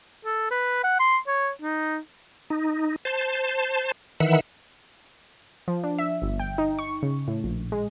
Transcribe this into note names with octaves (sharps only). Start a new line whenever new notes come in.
A4
B4
F#5
C6
C#5
D#4
D#4
C5 A5
D#3 E3 E5 F#5
F3
D4
E5
G1
G5
D#4
C#6
C#3
A2
A#1
G#3